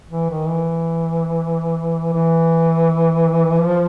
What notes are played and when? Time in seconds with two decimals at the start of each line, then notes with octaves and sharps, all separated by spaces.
0.10 E3
0.30 D#3
0.47 E3
2.13 E3
3.60 F3